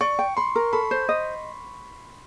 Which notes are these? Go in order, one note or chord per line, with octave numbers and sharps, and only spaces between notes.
D5 C#6
G5
B5 C6
A#4
A4 B5
C5
D#5